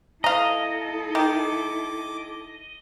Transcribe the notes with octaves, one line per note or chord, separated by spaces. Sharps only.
E4 A4 D#5 F5 A#5
D#3 D6